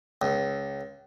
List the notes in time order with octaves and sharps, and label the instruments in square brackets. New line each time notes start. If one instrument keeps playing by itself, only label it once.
[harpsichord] C#2